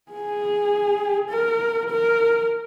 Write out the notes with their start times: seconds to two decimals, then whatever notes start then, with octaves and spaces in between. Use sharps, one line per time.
0.12 G#4
1.30 A#4
1.90 A#4